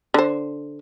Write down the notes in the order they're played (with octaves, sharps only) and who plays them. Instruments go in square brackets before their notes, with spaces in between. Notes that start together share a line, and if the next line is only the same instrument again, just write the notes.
[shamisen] D3 C5